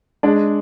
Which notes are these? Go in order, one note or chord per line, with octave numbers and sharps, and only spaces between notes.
G#3 D4